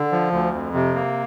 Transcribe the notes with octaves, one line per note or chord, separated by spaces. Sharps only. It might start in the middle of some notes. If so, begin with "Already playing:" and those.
Already playing: D3
F3
D2
F2
C3
A#3